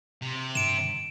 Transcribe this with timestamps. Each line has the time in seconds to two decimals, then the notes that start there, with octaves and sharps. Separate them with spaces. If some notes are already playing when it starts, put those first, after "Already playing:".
0.22 C3
0.55 G2 D7 E7